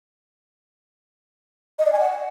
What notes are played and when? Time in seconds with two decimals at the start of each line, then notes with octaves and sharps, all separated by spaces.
1.79 D#5
1.85 D5
1.92 G#5
1.99 F#5